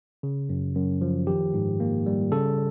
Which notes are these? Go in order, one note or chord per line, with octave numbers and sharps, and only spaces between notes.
C#3
F#2
F#2
F3
D#3 G4
G#2
A#3
G3
C#3 A4